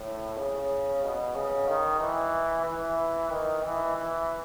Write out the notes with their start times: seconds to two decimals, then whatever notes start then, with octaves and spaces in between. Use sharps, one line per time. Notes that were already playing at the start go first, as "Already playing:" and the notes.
Already playing: A2
0.39 C#3
1.03 B2
1.36 C#3
1.68 D#3
2.01 E3
2.65 E3
3.31 D#3
3.64 E3
3.96 E3